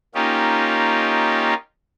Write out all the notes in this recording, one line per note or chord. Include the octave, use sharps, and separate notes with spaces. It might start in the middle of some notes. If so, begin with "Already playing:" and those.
A#3 C#4 D#4 F4 G4